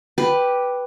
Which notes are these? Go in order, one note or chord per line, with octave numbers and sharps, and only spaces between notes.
G4 B4